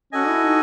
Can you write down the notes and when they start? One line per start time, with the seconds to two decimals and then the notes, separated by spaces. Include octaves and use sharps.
0.13 C#4 F#4 A4 D#5 G#5
0.29 E4
0.45 D#4